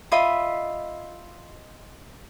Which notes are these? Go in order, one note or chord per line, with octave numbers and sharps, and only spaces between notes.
F4 D#5 E5 B5